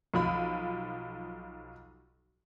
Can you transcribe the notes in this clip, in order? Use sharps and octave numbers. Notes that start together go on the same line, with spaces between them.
B1 F3 B5